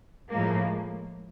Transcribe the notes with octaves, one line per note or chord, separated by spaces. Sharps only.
A2 F3 G#3 A#3